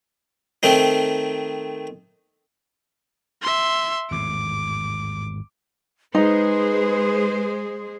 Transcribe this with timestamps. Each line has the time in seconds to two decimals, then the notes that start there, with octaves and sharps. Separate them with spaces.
0.63 D#3 A3 C4 D#4
3.42 E5 C6
4.11 G#1 E2 A2 D6
6.15 G#3 D#4 G#4 B4 C5